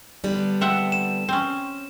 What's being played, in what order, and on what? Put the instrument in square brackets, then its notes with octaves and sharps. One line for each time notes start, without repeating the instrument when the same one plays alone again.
[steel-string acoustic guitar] D3 G3 B3
[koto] C4 E5 F#5
[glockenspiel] E7
[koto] C4 C#4